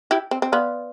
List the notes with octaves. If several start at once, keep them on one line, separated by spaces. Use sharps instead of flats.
E4 G4
C4
C4
B3 D5 F5 C6 F6